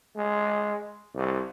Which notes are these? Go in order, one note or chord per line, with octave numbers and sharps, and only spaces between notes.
G#3
C2